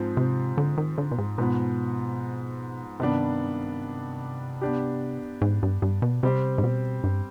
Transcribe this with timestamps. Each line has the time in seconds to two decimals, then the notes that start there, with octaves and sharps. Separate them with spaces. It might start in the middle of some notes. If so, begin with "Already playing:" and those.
Already playing: G#2 F3 C4
0.17 C3
0.58 D3
0.78 D#3
0.98 D3
1.11 B2
1.18 G#2
1.38 G#2 B2 F3 B3
3.00 G2 C3 D#3 B3 D4
4.61 B3 D4 G4
5.42 G#2
5.63 G2
5.82 G2
6.02 B2
6.23 C3 G3 C4 G4 C5
6.58 G#2
6.64 B2
7.04 G2